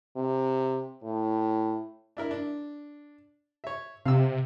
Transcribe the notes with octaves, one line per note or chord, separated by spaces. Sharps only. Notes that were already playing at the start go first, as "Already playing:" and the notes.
C3
A2
D4 E4 A#4
D4
C#5 E5
C3 F5 E6